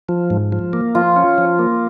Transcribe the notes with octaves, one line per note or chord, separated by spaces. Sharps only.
F3
G#2
F3
A#3
F3 F4
C#4
F3
A#3